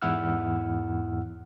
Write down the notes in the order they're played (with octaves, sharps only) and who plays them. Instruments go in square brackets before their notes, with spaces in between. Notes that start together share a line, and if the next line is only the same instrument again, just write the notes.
[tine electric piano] E2 G#2 E4 F#5 E6 F6